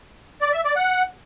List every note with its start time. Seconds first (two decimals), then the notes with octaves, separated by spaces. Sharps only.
0.41 D5
0.53 E5
0.64 D5
0.76 F#5